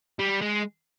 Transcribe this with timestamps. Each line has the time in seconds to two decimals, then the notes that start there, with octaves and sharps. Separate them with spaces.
0.19 G3
0.42 G#3